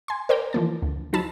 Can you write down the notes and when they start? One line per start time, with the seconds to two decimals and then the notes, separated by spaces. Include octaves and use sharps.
0.08 G#5 C6
0.29 A#4 C5 D5 G5 A#5
0.53 E3 F3 A#3 A5
0.82 D2
1.13 F3 F#3 D#4 A5 B5 E6